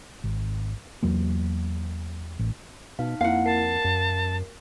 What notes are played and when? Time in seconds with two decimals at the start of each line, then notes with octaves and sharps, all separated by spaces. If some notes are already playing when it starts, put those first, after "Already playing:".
0.24 G#1
1.03 E2 F#3 A#3
2.39 A1
2.99 B2 D#4 F5
3.21 F2 A#3 E4 F5 F#5
3.46 A#4 A5 C7
3.85 F#2